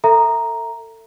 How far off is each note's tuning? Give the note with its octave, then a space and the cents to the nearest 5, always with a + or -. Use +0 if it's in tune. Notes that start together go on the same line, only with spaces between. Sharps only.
A4 +30 E5 +0 A#5 +0